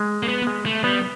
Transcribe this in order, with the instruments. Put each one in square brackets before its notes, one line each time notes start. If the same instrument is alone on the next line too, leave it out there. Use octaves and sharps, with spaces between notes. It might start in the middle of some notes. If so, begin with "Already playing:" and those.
Already playing: [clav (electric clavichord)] G#3
[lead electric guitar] A#3
B3
[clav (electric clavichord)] G#3
[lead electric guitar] A3
[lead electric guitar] G3 [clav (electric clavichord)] B3